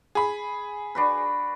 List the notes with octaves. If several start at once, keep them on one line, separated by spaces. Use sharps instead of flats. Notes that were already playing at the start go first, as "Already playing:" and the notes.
G#4 B5
D4 F#4 B4